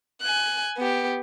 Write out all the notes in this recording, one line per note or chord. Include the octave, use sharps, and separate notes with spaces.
G#5 F#6
B3 G4